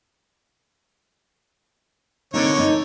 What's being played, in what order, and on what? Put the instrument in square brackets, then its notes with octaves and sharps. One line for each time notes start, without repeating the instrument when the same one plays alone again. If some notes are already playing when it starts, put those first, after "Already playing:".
[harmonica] D3 C#5 [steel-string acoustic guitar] A#3 C4 D#4
[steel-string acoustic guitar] A#3 D#4